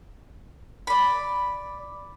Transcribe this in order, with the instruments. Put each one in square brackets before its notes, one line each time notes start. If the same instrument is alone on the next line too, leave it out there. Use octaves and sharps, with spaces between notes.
[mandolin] D5 B5